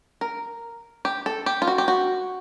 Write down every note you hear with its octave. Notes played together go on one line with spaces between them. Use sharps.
A#4
G4
A4
G4
F4
F#4
G4
F#4